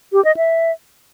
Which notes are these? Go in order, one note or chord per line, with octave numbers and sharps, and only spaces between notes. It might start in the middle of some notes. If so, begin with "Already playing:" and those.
G4
D#5
E5